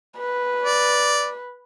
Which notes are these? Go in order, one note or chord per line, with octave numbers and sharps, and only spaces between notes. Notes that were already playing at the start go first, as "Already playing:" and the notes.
B4
D5